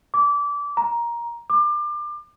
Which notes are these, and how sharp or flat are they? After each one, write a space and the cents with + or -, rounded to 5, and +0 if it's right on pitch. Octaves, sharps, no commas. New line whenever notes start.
D6 -25
A#5 +15
D6 +30